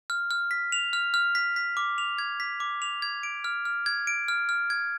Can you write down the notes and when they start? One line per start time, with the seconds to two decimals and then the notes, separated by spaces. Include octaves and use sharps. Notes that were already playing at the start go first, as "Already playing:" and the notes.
0.10 F6
0.31 F6
0.51 B6
0.72 F7
0.93 F6
1.14 F6
1.35 B6
1.56 B6
1.77 D6
1.98 F7
2.19 G#6
2.40 B6
2.60 D6
2.82 F7
3.02 G#6
3.23 D7
3.44 F6
3.65 F6
3.86 G#6
4.07 D7
4.28 F6
4.49 F6
4.70 G#6